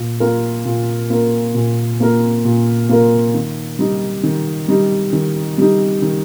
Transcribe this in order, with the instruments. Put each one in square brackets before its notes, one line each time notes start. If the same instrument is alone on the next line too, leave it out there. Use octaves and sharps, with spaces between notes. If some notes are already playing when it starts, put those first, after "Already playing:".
Already playing: [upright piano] A#2
A#3 F4 A#4
A#2
A#3 F4 A#4
A#2
A#3 F4 A#4
A#2
A#3 F4 A#4
D#3
G3 D#4
D#3
G3 D#4
D#3
G3 D#4
D#3